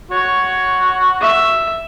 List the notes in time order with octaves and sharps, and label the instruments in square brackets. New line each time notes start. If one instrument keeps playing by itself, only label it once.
[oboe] F#4 [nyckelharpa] C#5
[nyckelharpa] E5